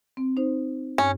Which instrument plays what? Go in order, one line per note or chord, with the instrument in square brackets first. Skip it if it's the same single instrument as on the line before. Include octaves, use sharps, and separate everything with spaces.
[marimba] C4
D#4 C5
[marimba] G2 [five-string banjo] C#4